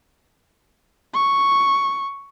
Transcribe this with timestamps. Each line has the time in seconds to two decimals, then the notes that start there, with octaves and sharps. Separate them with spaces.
1.14 C#6